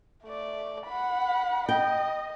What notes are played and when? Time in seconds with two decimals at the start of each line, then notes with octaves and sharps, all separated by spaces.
0.24 A3 D5
0.86 F#5 B5
1.69 D#5 G5